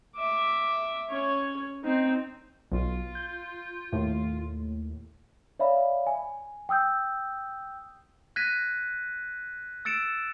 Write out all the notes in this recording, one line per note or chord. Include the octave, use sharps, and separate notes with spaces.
E5 D6
C#4 C#5
C4 D#4
B1 F4
G6
D#2 A2
C#5 D5 E5 F5 B5
G#5
G5 D#6 E6 G6
F#6 G#6 A#6 B6 D#7
E6 A6 C#7 D7 E7